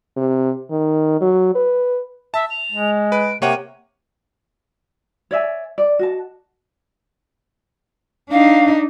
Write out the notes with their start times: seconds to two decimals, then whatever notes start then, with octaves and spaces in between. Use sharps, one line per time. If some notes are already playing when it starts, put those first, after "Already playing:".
0.17 C3
0.71 D#3
1.21 F#3
1.55 B4
2.34 E5 A5
2.50 F7
2.72 G#3
3.12 B4 D7
3.42 C3 A#3 C#5 F#5 D#7
5.31 C#5 D5 E5 G#5
5.78 D5
5.99 F#4 D#5 A5
8.31 D4 D#4 F5